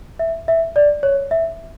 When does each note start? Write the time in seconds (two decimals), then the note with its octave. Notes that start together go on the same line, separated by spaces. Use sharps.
0.19 E5
0.48 E5
0.76 D5
1.03 C#5
1.31 E5